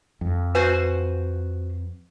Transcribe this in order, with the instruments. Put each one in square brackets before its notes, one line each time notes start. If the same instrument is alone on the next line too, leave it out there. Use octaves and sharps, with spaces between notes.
[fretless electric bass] F2
[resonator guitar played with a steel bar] F#4 C5 G#5 [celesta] B4